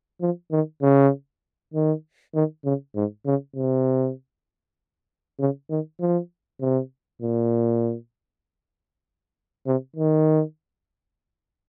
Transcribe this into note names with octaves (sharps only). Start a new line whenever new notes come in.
F3
D#3
C#3
D#3
D#3
C#3
G#2
C#3
C3
C#3
D#3
F3
C3
A#2
C3
D#3